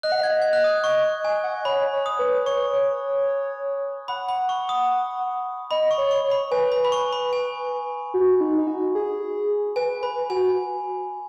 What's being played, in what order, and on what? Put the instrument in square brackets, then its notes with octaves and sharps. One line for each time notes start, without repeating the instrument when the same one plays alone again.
[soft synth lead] D#5 [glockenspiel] F#6
[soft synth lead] F#5
[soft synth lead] D#5 [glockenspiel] G#6
[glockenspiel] G#6
F#6
D#6
C#6
G#5
[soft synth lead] F#5
D#5
[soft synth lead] C#5 [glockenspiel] B5
[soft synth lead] C#5
[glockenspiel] D#6
[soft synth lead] B4
[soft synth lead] C#5 [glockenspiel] C#6
[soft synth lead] F#5 [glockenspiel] B5
[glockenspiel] B5
C#6
D#6
[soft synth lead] D#5 [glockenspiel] B5
[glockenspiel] C#6
[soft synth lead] C#5
[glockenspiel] C#6
[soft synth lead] C#5
[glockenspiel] B5
[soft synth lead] B4 [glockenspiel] G#5
[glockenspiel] B5
B5
C#6
B5
G#5
[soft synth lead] F#4
D#4
D#4
F#4
G#4
[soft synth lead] B4 [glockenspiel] G#5
[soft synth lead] B4 [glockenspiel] B5
[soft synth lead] F#4 [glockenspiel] G#5